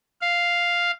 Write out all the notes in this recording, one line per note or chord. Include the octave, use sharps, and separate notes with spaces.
F5